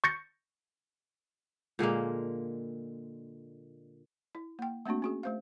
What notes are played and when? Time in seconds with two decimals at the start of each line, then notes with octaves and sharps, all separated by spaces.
0.04 C#6 G6 A6 A#6 C#7
1.79 A#2 D3 G#3 A#3
4.35 E4
4.59 A#3 G5
4.85 A3 A#3 C4 D4 F#4
5.02 C#4 F#4 G#4
5.23 A3 C5 F5